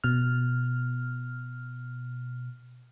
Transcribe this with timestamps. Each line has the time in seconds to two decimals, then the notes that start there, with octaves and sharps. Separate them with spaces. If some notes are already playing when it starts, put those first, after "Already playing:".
0.04 B2 F6